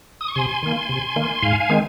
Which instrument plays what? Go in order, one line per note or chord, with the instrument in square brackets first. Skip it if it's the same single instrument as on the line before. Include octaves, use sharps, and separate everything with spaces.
[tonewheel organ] D#6
C#6
C3 G#5 C6
D#3 A#3
C3
D#3 A#3
G#2 F5 G#5
F5 G#5
D#3 G#3 C4